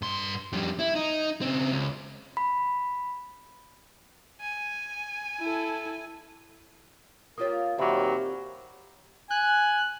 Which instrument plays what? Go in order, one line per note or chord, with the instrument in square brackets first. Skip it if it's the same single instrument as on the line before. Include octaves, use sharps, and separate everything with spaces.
[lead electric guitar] G2 C6
F2 G3
E4
D#4
C#3 C4
C#2
[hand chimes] B5
[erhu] G#5
[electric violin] E4 A4
[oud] A#3 F4 G4 [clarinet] A#4 [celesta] C#5 D#6
[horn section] A#2 D#3 F#3 [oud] C4 [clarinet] G4 [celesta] E5 B5 D6
[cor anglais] G#5 [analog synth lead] F#6